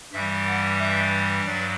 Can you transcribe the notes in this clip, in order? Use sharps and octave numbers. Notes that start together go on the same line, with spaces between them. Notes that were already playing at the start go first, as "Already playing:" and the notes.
G2 E3 G3 E5
F#5
E5
G2 F#3 D5